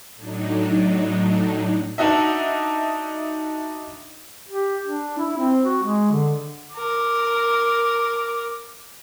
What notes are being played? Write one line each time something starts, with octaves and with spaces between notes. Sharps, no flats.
A2 F#3 D4 D#4
D4 D#4 F#4 D#5 E5
G4
D4
E4
C4
F#4
G#3
D3
A#4 D6